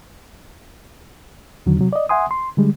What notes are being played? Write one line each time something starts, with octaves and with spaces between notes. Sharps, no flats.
E2 D3 D#3 F#3
C3 F#3
D5 D#5
E5 F#5 G#5 C6 D#6
C6
D3 G3 G#3